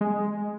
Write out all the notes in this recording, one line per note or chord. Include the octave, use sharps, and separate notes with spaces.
G#3